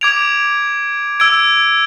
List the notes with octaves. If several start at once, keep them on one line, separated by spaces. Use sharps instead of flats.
D6 G#6 D7 F7
E6 G#6 D7